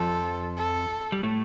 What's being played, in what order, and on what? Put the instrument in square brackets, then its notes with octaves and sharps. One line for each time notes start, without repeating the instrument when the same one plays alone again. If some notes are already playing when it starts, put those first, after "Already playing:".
Already playing: [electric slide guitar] F2 F3 [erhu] A4
[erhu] A4
[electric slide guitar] G3
A2 A3